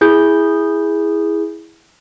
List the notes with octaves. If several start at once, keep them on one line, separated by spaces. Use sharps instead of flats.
E4 G#4 G6